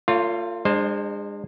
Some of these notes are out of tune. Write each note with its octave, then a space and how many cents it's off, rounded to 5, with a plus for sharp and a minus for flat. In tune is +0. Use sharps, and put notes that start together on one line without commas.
A3 +40 F4 +0 C#5 +30
G#3 -30 D4 +30 C5 +0